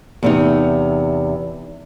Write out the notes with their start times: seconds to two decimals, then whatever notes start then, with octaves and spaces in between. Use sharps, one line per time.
0.23 E2 C3 D#4